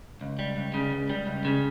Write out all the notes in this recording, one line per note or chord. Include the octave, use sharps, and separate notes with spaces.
C#2
G3
C#2
C#3
C#2
G3
C#2
C#3